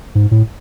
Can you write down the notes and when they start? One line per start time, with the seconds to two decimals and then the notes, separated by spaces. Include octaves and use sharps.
0.15 G#2
0.31 A2